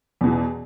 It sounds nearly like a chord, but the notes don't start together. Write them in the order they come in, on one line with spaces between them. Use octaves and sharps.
E2 B2 E3